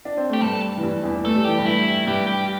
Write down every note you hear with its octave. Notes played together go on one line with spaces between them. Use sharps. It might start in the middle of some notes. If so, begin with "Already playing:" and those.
D4
C4
A3 G4
G2 G3 A4
E3
G2 G3
E2 E3
A3 A4
G3
E3 G4
G2 G3
E4
G2 G3 G4
G4